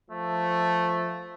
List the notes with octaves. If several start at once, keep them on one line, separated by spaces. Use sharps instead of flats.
F3 A3